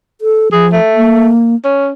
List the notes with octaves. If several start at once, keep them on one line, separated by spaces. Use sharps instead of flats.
A4
F3 G#4
A3
A#3
C#4